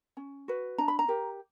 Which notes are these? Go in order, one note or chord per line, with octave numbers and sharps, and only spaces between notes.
C#4
F#4 B4
D4 A#5
B5
A#5
G4 A#4